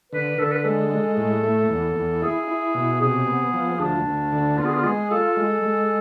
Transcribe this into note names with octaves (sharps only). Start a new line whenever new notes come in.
D3 B4
D3 A4
B4
G#3 A4
G#3
A2
A3
E2
E2
E4 G#4
E4
B2
C3 G#4
B3
F3
D2 D4
D2
D3
B3 F4
G#4
F4
G#3 G#4
F4 A4
G#3
G#3